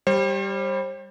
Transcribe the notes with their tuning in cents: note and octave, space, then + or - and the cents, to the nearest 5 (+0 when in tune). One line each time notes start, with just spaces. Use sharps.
G3 +0 C5 +40